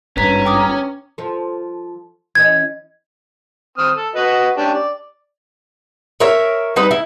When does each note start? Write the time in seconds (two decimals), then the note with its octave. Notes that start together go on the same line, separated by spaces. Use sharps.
0.17 G#1 G2 C#4 B4 A#5 B6
0.45 G5 D6 D#6
1.18 F3 A4
2.35 E3 C#4 D#5 G#6
3.78 C4 D#6 F6
3.96 A4
4.16 F#4 B4 D#5
4.57 C#4 D4 G4
4.74 D5
6.20 A#4 C#5 E5
6.76 G3 D#4 B4
6.91 E4